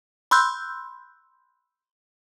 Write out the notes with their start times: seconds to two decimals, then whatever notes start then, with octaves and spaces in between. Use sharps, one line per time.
0.31 B5 C6 E6 F#6 G6